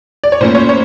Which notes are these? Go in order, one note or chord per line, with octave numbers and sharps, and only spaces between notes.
D5
C#5
A2 F3 A#3 C#4 C5
C#5
C#5